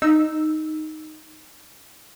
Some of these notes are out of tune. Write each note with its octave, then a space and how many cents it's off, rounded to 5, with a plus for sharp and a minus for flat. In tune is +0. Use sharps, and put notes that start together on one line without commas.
D#4 +0 E6 +0